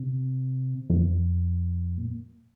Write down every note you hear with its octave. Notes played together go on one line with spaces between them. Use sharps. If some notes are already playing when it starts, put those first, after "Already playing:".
Already playing: C3
F2
A#2